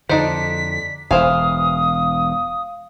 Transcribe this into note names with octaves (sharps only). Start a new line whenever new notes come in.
F2 D3 D4 D#4 C5 B6
E1 E3 C5 F5 G#5 D#6